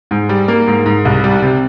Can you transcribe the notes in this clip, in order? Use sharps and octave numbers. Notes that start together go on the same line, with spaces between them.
G#2
G3
A#3
G#2
G#2
C2
G3
C3